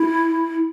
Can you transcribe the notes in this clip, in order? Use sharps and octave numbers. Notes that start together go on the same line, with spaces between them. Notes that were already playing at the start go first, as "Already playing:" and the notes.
Already playing: E4